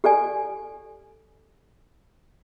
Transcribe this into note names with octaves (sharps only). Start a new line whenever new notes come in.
G4 A4 D5 G#5